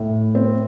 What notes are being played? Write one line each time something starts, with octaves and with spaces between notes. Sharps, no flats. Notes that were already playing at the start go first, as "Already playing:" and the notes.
Already playing: A2
C4